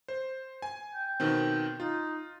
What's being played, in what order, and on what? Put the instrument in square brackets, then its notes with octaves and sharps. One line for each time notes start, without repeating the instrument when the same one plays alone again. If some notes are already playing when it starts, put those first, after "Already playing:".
[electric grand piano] C5
G#5
[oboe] G5
[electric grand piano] B2 D#3 C4
[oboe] D#4 [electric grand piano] F4